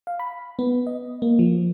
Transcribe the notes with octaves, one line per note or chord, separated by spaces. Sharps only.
F5
B5
B3
D#5
A#3
F3